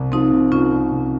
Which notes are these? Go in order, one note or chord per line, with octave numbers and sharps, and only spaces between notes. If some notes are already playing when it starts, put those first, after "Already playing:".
Already playing: C2 C3
F3 C4 D#4
C3
C2 C#4 F4
C2
C3